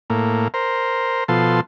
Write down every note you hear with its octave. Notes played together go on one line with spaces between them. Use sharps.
A2 A#3
A#4 C5
B2 F3 A4 C6